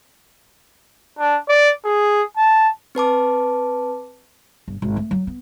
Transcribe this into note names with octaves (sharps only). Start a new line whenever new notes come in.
D4
D5
G#4
A5
C4 B4 A5 D6
G1
G#1
A3
F#3
B3